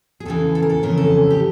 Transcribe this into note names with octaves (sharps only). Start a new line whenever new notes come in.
G#4
E2 C#3 E3 A4
A4
A#4
A4
F2 C#3 E3 A#4
A4
G4